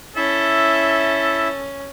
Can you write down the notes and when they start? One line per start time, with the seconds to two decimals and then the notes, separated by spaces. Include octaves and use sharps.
0.16 C#4 E4 A4 E5